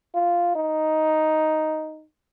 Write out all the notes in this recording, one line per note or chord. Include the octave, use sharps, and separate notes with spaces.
F4
D#4